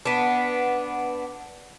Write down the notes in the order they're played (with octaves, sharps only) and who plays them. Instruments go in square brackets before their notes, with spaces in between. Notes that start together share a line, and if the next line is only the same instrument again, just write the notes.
[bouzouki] B3 D4